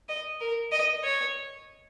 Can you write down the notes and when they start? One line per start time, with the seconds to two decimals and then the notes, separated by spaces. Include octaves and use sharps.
0.09 D#5
0.41 A#4
0.72 D#5
1.04 C#5